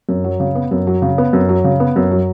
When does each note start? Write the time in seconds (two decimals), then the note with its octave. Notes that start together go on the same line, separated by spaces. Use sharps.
0.09 F#2
0.24 F#3
0.40 C#3
0.55 B3
0.71 F#2
0.87 F#3
1.02 C#3
1.18 B3
1.33 F#2
1.49 F#3
1.64 C#3
1.80 B3
1.96 F#2
2.11 F#3